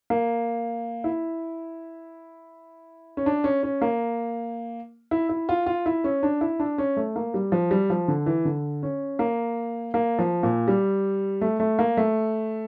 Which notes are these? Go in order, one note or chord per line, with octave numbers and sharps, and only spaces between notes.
A#3
E4
C#4
D4
C#4
C#4
A#3
E4
E4
F4
F4
E4
C#4
D4
E4
D4
C#4
A3
A#3
G3
F3
G3
F3
D3
E3
D3
C#4
A#3
A#3
F3
A#2
G3
A3
A3
A#3
A3